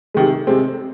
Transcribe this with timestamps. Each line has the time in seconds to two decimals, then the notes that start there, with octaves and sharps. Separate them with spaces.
0.14 C3 D#3 G#3
0.47 C3 G#3 C4